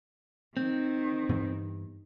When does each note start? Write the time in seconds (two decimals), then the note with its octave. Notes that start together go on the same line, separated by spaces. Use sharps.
0.57 D#3 C4
1.29 G2 E3 B3